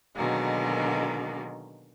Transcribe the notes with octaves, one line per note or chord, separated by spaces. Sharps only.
B2 D3 D#3 F#3 G#3 A#3